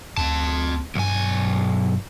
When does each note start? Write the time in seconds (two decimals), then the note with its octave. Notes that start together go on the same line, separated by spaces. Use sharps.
0.18 D2 C4 A5
0.95 B1 G2 G#5